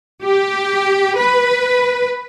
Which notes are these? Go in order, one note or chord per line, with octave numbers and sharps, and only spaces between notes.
G4
B4